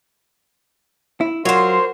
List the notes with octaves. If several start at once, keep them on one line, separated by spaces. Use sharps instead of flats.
E4
F#3 F4 F#4 A#4 C5 C#5 C6